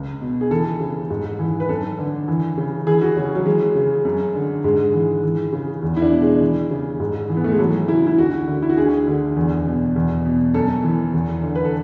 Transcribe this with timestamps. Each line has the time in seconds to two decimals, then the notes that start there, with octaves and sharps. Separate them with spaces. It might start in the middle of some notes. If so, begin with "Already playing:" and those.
Already playing: C#2
0.21 B2
0.41 G#4
0.51 E3 A4
0.80 C#3
1.10 G#2
1.39 E3
1.60 B4
1.69 F#2 A4
1.98 D3
2.28 E3
2.58 C#3
2.87 E3 G#4
3.02 F#4
3.17 C#3 C#4
3.35 F#3
3.46 E3 G#3
3.75 C#3
4.05 F#2
4.35 D3
4.64 G#2 G#3
4.93 E3
5.23 E3
5.53 C#3
5.82 E2
5.97 E4
6.02 D4
6.12 B2
6.22 G#3
6.41 E3
6.71 C#3
7.00 G#2
7.30 E3
7.37 B3
7.44 A3
7.52 G#3
7.59 E3 F#3
7.88 C#3 E4
8.07 E4
8.18 D2 F#4
8.48 D3
8.62 E4
8.70 F#4
8.77 D2 G#4
9.07 D3
9.36 E2
9.66 B2
9.96 E2
10.25 B2
10.54 F#2 A4
10.84 E3
11.14 E2
11.43 D3
11.55 B4
11.64 A4